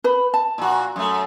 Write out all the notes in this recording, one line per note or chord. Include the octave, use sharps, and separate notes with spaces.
B4 B5
A5
A#2 F#4
F#2 A3